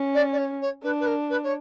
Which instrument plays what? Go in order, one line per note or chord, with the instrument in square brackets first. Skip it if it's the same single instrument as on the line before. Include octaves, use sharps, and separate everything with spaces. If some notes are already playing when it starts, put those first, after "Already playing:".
Already playing: [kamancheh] C#4
[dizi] D5
D5
C#5
C#5
[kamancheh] D4 [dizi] B4
[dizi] B4
A#4
B4
C#5